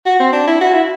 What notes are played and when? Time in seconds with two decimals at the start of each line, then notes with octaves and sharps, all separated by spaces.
0.06 F#4
0.19 C4
0.33 D4
0.47 E4
0.61 F#4
0.74 E4